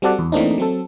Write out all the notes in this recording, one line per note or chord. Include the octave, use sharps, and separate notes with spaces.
G3 C4 F#4 A4 D5 F#5
E2
E3 A3 A#3 C4 D4 D#4
F#3 C4 A4